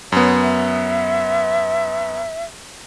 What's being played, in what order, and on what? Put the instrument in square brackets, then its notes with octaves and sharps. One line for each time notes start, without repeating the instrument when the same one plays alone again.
[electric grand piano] F#2 B3 [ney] C#5
[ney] E5